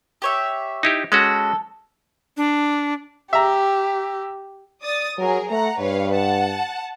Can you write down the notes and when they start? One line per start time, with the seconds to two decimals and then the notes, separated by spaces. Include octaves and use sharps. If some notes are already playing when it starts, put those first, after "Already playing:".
0.22 G4 C#5 E5
0.83 D#4 E4 G4
1.12 G#3 C#4 F#4 A4
2.37 D4
3.33 G4 E5 A#5
4.82 D5 D#6 A6
5.18 F#3 G#4 A#4
5.51 A3 F#5 A#5
5.79 G2 B4 C#5 F5
6.13 F#5 A5